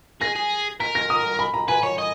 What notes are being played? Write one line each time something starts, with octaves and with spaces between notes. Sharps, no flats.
G#4 A#6
G#4
A#4 B6
A#6
D#6
B5
A#5
B4 G#5
C#5
D#5